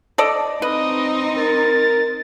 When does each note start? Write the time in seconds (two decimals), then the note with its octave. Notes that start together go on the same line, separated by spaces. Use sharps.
0.18 A4 D5 D#5
0.62 C4 D#4 B4 D#5
1.37 A#4 A6